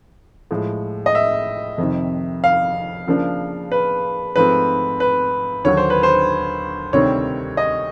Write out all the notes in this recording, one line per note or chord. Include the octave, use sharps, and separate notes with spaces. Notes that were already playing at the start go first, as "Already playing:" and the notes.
A2 F3 G#3
D#5
E5
F2 C3 D#3
F5
C#3 F3 A#3 D4
B4
G#2 F3 A3 C4 B4
B4
D#2 D3 F#3 C#5
C5
B4
C5
D2 C3 D#3 G3 C4 C#5
D#5